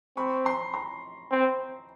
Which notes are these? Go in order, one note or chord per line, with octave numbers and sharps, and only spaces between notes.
C4 B5 C#6
A#5 C6
A#5 C6
C4